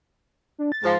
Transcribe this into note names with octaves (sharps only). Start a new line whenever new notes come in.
D4
A6
G#2 F3